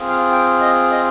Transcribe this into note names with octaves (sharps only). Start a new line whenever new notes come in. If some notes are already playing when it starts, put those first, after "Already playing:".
Already playing: C4 F4 G#4
F5
G5
D#5
D#5